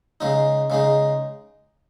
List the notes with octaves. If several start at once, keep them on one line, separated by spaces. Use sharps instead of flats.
C#3 G#3 D#4
C#3 G#3 D#4